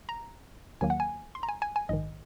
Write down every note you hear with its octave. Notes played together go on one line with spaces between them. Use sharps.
A#5
D#2 D#3 F#3 A#3 G#5
F#5
G#5
C6
A#5
G#5
G#5
G#5
A#1 G#2 D#3 D#5